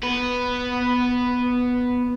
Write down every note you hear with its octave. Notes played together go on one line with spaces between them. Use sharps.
B3 B4